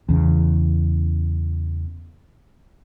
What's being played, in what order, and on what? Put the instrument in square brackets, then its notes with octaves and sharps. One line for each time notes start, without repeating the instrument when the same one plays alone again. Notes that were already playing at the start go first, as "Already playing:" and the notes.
[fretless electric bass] E2 C#3